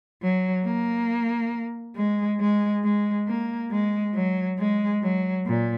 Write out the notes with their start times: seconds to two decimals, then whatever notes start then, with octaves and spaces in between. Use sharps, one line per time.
0.22 F#3
0.65 A#3
1.96 G#3
2.40 G#3
2.84 G#3
3.27 A#3
3.71 G#3
4.14 F#3
4.58 G#3
5.03 F#3
5.46 A#2